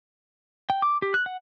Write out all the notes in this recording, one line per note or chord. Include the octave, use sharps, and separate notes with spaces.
G5
D6
G4
F#6
F#5